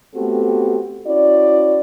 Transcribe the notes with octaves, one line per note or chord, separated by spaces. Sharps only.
A3 B3 C4 F#4 G4 A4
C#4 E4 F#4 D5